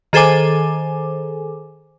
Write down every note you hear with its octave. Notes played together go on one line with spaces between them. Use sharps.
D#3 G#4 A4 C5 G#5 D6